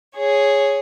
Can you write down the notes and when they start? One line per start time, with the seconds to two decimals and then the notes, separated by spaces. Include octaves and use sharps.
0.17 G#4 C#5